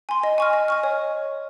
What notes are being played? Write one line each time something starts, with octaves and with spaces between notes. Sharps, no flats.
G#5 C6
D#5
G#5 C#6 F6
D#5
G#5 C#6 F6
C#5